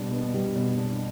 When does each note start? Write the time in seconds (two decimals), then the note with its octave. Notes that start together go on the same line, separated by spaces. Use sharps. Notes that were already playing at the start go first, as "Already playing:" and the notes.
Already playing: B2 G3 D4
0.11 B3
0.34 G3
0.55 B2
0.77 D4